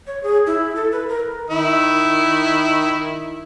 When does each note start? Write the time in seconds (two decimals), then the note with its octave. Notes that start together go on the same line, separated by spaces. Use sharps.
0.07 C#5
0.23 G#4
0.47 E4
0.76 A4
0.92 B4
1.09 A#4
1.50 D#3 E4